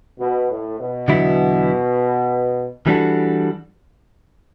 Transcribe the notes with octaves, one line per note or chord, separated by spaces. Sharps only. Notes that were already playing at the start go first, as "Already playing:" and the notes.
B2
A2
B2
E2 D3 F#3 B3 E4
E3 G3 D4 F#4 A4